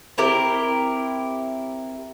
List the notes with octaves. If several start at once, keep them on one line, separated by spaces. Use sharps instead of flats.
C4 E4 G4 A#4